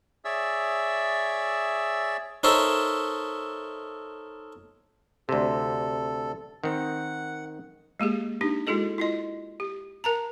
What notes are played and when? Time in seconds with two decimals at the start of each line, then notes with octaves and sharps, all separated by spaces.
0.25 G#4 C#5 D5 E5 E6
2.43 D#4 A4 A#4 C5 C#5 E5
5.29 D2 C3 A4
6.64 D#3 C4 F#5
8.00 G#3 A#3 G4 G#4
8.41 D4 D#4 G4
8.67 G#3 E4 F#4 G#4 A4 D#5
8.98 E4 F4 D#5
9.60 G4
10.04 A#4 A5 A#5